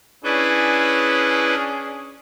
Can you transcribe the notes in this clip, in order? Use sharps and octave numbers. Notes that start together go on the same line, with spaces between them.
C#4 D4 E4 G#4 B4